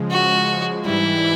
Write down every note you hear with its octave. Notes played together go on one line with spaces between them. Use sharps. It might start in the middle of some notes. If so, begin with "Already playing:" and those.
Already playing: C#3 F3 G#3
F#4
G#2 E3 G3 E4